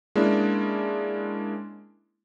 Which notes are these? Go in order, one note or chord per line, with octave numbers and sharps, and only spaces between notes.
G#3 A#3 C#4 D4 E4